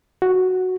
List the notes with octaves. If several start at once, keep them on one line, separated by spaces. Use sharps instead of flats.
F#4